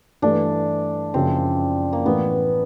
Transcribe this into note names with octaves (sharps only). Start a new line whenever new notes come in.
G2 E3 A3 D4
F#1 F#2 C#3 F3 C4
A#3
A1 A2 E3 B3